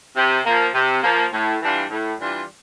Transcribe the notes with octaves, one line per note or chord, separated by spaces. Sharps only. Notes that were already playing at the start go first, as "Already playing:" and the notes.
C3
F3 A#3
C3
F3 A#3
A2
E3 G3 D4 F4
A2
E3 G3 D4 F4